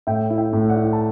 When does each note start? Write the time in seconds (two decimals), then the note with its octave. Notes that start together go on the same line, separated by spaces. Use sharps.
0.07 A2 E5 G5
0.30 E4
0.38 E5 G5
0.53 A2
0.69 D5 F#5
0.76 E4
0.93 A5